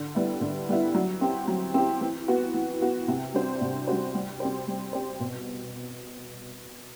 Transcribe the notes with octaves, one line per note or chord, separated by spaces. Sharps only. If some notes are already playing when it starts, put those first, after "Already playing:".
Already playing: D3
G3 B3 E4
D3
G3 B3 E4
F#3
C4 E4 G4
F#3
C4 E4 G4
E3
B3 F#4
E3
B3 F#4
C3
G3 D4 F#4 C5
C3
G3 D4 F#4 C5
G3
C4 G4 C5
G3
C4 G4 C5
B2